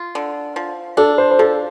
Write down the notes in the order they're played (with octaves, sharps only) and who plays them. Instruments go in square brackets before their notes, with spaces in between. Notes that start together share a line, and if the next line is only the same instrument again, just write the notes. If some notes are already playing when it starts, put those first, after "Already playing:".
Already playing: [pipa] F4
D3
F3
[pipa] D4 [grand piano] A4
[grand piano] C5
C5
[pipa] F3 [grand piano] A4